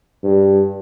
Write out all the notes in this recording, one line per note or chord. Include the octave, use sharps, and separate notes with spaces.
G2